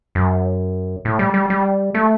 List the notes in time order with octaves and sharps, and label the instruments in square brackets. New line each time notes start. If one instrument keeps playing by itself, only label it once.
[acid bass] F#2
A2
G3
G3
G3
A3